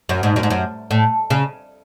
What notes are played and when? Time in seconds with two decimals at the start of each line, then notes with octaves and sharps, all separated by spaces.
0.09 F#2
0.23 G#2
0.36 F#2
0.43 G#2
0.50 F#2
0.91 A2
1.30 C#3